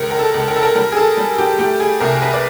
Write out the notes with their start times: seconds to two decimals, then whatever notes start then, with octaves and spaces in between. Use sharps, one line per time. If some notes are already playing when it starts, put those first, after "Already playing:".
Already playing: C#2 A#4
0.11 A#4
0.19 A4
0.34 C#2
0.48 A#4
0.56 A4
0.63 A#4
0.75 G3 A#4
0.92 G#4
0.97 A4
1.17 G3
1.38 G4
1.58 A3 G4
1.80 G#4
2.00 C2 A#4
2.22 B4
2.33 D5